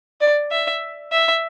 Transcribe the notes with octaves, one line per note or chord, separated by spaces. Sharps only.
D5
E5
E5